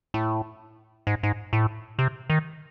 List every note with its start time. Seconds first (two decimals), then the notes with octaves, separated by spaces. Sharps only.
0.14 A2
1.07 G#2
1.23 G#2
1.53 A2
1.99 C3
2.30 D#3